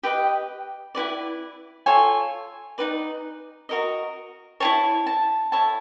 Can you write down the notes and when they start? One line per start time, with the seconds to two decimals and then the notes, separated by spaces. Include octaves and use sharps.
0.03 G4 B4 D#5 G5
0.95 E4 G4 B4 D5
1.86 F4 A4 C#5 G#5
2.78 D#4 F#4 B4 D5
3.69 F#4 A#4 D#5
4.60 E4 G#4 C#5 A5
5.06 A5
5.52 E4 A4 C#5 A5